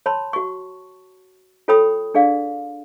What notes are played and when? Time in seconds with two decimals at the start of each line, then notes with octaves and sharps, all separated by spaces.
0.06 C#5 A5 B5 C6
0.33 F#4 C#6
1.68 F4 A4 C#5 G5 B5 D#6
2.14 D4 G#4 D5 F5